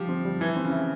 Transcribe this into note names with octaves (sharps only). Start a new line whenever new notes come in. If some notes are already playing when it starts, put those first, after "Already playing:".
Already playing: F3 G3 G4
C4
G3
E3 E4
C4
C#3
E5